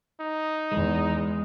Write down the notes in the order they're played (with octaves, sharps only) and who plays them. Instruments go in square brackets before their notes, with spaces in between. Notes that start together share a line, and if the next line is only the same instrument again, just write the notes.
[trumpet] D#4
[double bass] E2 [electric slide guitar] G#3